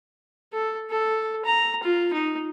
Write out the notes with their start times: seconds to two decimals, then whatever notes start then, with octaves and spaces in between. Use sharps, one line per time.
0.53 A4
0.90 A4
1.45 A#5
1.83 F4
2.13 D#4